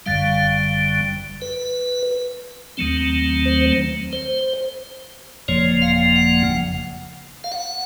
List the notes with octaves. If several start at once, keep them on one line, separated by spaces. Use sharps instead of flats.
G1 F#2 D3 G3 F5
B4
D#2 D#3 F#3 A3 C4
C5
C5
G1 F2 C#3 F3 A#3 C#5
F5
F#5
F5
F#5